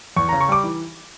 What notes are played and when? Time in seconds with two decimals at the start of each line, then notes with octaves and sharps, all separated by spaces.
0.16 E2 C#6
0.29 C#3 A#5
0.41 C#6
0.48 G3 D6
0.64 E3